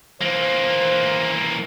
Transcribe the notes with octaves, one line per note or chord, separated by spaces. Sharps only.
E3 A#3 C5